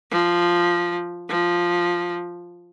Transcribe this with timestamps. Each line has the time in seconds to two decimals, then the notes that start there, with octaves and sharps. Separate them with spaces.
0.11 F3
1.29 F3